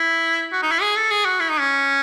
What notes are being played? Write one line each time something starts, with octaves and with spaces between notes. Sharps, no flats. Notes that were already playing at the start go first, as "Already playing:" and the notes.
Already playing: E4
F#4
D#4
E4
G#4
A4
G#4
F#4
E4
D#4
C#4